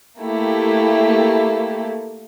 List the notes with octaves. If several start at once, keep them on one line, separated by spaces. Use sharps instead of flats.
A3 A#3 E4 G4